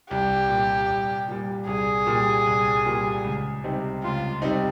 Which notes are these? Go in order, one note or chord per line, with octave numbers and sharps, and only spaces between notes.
C2 G4
A#2 G3
C2
A#2 G3
C2 G#4
A#2 G3
C2
A#2 G3
C#2
C3 G3 C4 D#4
C#2 F4
C3 G3 C4 D#4